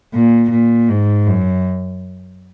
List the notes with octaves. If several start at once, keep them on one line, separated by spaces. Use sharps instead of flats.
A#2
A#2
G#2
F#2